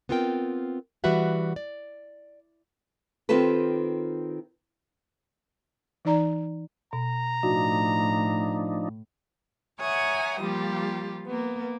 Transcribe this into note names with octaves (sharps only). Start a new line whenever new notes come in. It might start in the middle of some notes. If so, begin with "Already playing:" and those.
B3 C4 F4 A#4 G5
E3 G3 F#4 B4 E5 F#5
D5
D#3 C4 F4 G4 A4 B4
E3 D#4 D5 A#5
B2 A#5
A2 F3 D4 D#4 F#4
C#5 E5 F#5 G#5 A#5 D#6
F3 G3 A#3 F4 G4
A#3 B3